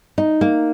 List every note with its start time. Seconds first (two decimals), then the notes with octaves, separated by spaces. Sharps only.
0.18 D#4
0.41 A#3